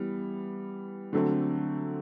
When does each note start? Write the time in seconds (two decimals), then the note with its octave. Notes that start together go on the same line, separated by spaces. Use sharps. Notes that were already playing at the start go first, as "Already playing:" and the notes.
Already playing: E3 G3 B3
1.13 D3 F#3 A3 C4